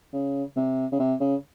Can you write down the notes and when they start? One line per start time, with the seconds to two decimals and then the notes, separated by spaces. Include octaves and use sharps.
0.13 C#3
0.56 C3
0.92 C#3
0.99 C3
1.20 C#3